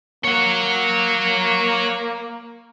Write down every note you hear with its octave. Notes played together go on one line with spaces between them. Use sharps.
A#3 C#5 F#5